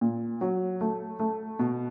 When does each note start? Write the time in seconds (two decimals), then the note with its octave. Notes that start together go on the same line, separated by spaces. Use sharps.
0.01 A#2
0.41 F#3
0.81 A3
1.20 A3
1.59 B2